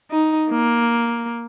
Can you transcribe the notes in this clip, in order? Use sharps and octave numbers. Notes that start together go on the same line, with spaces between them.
D#4
A#3